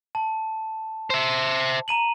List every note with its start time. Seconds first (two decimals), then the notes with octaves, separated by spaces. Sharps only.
0.15 A5
1.10 C5 E5
1.88 A#5 D#7 F#7